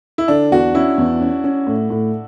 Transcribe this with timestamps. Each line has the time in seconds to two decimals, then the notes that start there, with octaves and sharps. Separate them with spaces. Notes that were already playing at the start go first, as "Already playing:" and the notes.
0.18 E4
0.28 D3 D4
0.51 E2 F#4
0.75 C#4 E4
0.98 E2
1.20 C#4
1.44 C#4
1.67 A2
1.90 A2